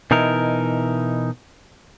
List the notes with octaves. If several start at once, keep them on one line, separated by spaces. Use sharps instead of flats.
B2 E3 D#4 E4 A#4